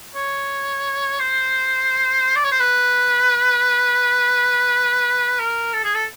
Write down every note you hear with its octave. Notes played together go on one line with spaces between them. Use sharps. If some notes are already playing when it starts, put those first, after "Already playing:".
C#5
C5
D5
C#5
C5
B4
A#4
A4
G#4
A4